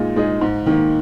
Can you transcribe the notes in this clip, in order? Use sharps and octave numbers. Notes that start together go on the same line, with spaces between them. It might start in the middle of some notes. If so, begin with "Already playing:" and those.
Already playing: A#2 G#3 D#4 G#4
G#3 D#4 G#4
G#2
D#3 A#3